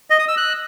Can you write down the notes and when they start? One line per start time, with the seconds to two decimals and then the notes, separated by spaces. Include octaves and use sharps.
0.10 D#5
0.19 D#6
0.28 E6
0.37 F#6